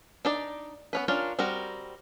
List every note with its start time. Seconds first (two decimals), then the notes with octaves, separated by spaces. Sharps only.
0.25 D4 D#4 D5
0.93 B3 C#4 B4
1.08 C#4 D4 F4 A#4
1.39 G3 C4 F#4 A#4